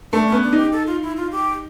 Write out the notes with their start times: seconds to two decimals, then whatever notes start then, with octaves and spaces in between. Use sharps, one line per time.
0.12 A3 D4
0.27 B3 C#4
0.43 D4
0.53 D#4 G4
0.72 A4
0.87 F4
1.02 E4
1.17 F4
1.31 G4